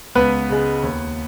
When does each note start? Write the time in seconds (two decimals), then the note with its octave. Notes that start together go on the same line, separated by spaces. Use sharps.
0.15 C#2 B3 B4
0.49 C#3 G#3
0.83 D#2